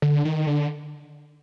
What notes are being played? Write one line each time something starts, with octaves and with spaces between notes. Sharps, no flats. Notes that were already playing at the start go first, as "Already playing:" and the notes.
D3
D#3
D3